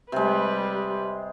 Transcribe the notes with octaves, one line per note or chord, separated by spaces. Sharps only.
C3 G3 G#3 B4